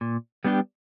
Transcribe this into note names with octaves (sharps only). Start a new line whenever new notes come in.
A#2
G3 B3 D4 G4